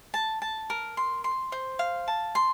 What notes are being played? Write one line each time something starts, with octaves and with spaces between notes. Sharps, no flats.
A5
A5
A#4
C6
C6
C5
F5
A5
C6